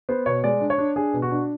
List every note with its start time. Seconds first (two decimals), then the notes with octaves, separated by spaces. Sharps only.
0.09 B3 C5
0.26 B2 C#5
0.44 G#3 D5
0.61 D4
0.70 C#5
0.78 D4
0.96 D4 G#4
1.14 B2
1.22 F#4
1.31 D4